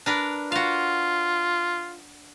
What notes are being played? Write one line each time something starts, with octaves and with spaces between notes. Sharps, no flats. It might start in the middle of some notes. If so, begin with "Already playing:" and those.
D4 A#4 B4
F4 F#4 F5